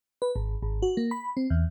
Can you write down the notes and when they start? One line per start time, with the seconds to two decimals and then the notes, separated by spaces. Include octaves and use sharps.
0.22 B4
0.36 G#1
0.62 G#1
0.82 F#4
0.97 A#3
1.11 B5
1.37 C4
1.50 E2